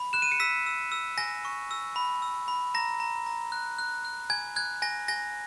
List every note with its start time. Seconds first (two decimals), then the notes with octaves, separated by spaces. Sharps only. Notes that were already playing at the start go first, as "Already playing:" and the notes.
Already playing: B5
0.13 F#6 E7
0.22 D#7
0.32 C#7
0.40 E6 B6
0.66 E6
0.92 E6
1.18 G#5 A#6
1.45 C#6
1.71 E6
1.96 B5
2.22 E6
2.48 B5
2.74 A#5 A#6
3.00 A#5
3.27 A#5
3.52 F#6
3.79 F#6
4.05 F#6
4.30 G#5 G#6
4.56 F#6 G#6
4.82 G#5 A#6
5.08 G#5 A#6